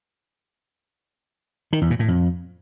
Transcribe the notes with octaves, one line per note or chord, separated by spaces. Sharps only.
D#3
E2
A#2
A2
F2